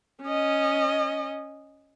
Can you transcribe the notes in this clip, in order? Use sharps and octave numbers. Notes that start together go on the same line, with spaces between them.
C#4 D#5